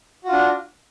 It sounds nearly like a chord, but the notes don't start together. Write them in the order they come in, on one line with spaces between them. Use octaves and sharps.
F#4 F4 D4